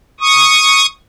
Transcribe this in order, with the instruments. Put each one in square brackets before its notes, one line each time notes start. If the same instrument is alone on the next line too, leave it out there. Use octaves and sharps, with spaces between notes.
[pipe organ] C#6 D#6